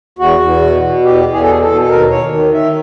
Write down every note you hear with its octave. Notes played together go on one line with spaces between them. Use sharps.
E2 F#4
E2
B2
B2
E2 G4
E2
G#4
A4
B2 G#4
A4
B2
A4
D#2 A#4
D#2 C#5
D#3
D#3 E5